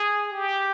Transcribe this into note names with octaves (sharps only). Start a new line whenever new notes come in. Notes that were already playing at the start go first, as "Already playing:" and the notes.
Already playing: G#4
G4